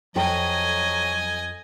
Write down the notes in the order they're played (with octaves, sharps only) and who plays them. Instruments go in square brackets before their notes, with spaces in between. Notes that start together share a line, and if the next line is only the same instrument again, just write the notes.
[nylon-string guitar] F2 A4 G5 [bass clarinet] F#3 [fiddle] D#5 G#5